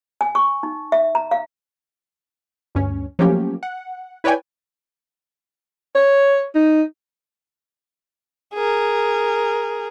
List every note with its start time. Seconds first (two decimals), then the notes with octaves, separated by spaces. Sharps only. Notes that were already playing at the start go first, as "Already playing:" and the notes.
0.21 G#5
0.35 C#6
0.63 D#4
0.92 E5
1.15 A#5
1.31 F5
2.75 D2 G2 C#4
3.19 F3 F#3 A3 A#3 C#4 G4
3.63 F#5
4.24 E4 B4 C#5 D5 G5 G#5
5.95 C#5
6.55 D#4
8.54 G#4 A#4